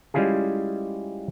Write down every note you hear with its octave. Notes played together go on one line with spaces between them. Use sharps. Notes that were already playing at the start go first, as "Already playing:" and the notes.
G3 G#3 C#4 E4 F4 G#4